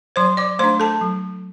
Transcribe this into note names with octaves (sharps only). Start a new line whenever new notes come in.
F#3 C5 C6
D5 D6
A3 D4 C5 C6
A4 A5
F#3